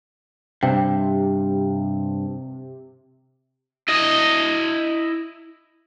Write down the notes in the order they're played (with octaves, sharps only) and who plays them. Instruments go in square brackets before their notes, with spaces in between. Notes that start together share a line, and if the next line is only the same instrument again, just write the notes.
[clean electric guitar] G2 [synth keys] C3 [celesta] G5
[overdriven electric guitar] E4 D#5